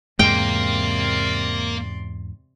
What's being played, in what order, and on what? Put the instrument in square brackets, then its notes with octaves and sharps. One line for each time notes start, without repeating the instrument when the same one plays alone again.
[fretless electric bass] E2 G#2 G#3 [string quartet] C3 D5 C6 [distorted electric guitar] A#3 [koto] G5